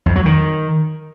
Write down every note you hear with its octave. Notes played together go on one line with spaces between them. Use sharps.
F2
F#3
D#3